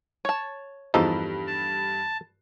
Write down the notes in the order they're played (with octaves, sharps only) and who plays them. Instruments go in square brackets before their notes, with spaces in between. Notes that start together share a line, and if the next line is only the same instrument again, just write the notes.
[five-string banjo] C#5 A5
[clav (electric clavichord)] E2 F3 D#4 [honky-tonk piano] G2 [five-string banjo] A4
[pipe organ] A5